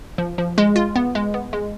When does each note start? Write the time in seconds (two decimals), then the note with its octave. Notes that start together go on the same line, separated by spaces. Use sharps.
0.18 F3
0.38 F3
0.58 G#3
0.76 F4
0.96 B3
1.15 G#3
1.34 B3
1.53 G#3